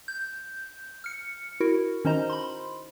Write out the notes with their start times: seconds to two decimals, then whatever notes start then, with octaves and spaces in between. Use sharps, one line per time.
0.08 G6
1.04 F6 C#7
1.60 E4 F#4 A#4
2.05 D#3 C#4 D#4 C5 D#5 A#5
2.30 B5 C6